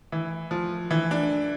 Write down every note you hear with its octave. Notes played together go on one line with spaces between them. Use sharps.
E3
F3
E3
D4